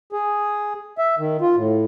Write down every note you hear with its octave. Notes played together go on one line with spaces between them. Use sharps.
G#4
E5
D#3
F4
A2